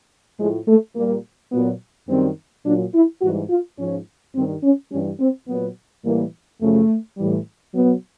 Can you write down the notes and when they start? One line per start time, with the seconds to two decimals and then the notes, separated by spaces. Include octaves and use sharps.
0.39 A2 F3 G#3
0.68 A3
0.96 A#2 G3 A#3
1.52 A#2 F#3 B3
2.09 F#2 D#3 G3 C4
2.66 A#2 F#3 D4
2.94 E4
3.22 G#2 E3 G3 F#4
3.50 F4
3.78 G#2 F3 C#4
4.35 G2 D#3 G3 C4
4.63 C#4
4.92 G2 E3 G3 C#4
5.20 C4
5.48 A#2 F#3 B3
6.05 A2 E3 G3 A#3
6.61 F#2 C#3 F3 A3
7.17 A2 E3 G3
7.74 B2 F#3 B3